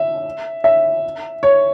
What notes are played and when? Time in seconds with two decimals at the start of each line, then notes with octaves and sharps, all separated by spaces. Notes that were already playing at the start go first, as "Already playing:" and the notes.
Already playing: E5
0.64 E5
1.43 C#5